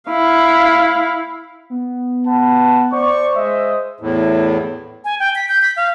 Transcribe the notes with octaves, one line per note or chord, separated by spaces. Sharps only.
E4 F5
B3
B4 F#5 A5
C5 D5 C#6
G#3 D#5 E5
E2 A2
G#5
G5
B6
G6
B6
F5